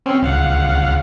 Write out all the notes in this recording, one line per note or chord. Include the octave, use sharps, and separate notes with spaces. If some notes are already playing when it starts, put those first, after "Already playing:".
C4 C#4
C#2 F5 F#5